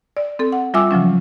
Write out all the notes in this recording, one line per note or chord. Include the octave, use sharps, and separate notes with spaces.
D5
C4 A4
F#5
G3 F4 E5 G#5 D6 E6
C#3 F3 F#3 C#4